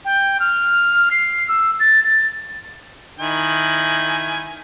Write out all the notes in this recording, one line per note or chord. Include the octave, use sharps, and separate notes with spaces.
G5
F6
C7
E6
A6
A6
D#3 E4 G#5